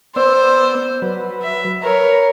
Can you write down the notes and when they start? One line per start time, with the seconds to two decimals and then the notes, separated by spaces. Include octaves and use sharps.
0.16 B3 C5 D5 E6
1.02 F#3 B4
1.42 E5
1.83 A#4 B4 C#5